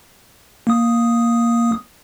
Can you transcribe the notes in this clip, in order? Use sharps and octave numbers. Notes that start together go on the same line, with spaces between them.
A#3 D#6